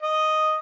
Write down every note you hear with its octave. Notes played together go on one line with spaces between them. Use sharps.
D#5